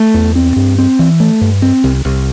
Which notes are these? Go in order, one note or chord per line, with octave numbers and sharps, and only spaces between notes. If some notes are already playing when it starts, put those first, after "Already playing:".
Already playing: A3
E2
C4
G2
C4
E3
A3
G2
C4
C2
C2